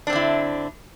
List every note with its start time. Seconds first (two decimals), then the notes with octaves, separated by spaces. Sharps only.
0.07 D4
0.10 C4
0.13 D3
0.16 E4